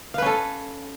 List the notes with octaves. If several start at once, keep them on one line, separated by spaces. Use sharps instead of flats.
C#4 A4 B4 F5